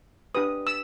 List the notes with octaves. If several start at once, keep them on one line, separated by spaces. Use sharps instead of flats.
D4 G4 B4 D#6
E6